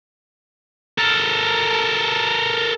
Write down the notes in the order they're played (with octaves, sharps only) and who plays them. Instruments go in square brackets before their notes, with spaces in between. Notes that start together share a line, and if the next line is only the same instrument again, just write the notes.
[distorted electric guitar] A4 A#4